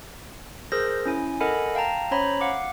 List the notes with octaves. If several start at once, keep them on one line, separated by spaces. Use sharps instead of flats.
G#4 A#4 C5 E6 G6 A#6
C#4 E4 G#5
A4 A#4 D#5 F#5 G#5 B5
F5 G5 A5 A#5
C#4 C5 C#5 A#5 B5
F5 F#5 D6